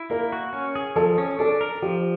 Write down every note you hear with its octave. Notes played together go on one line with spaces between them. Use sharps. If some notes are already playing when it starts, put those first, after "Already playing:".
Already playing: E4
A#3 A#4
F#4
C#4
G#4
F3 A4
C#4
D4 A4
A#4
F3 G4